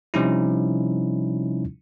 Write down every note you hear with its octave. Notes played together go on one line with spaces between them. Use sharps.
C3 F3 G3 C#4 D#4 E4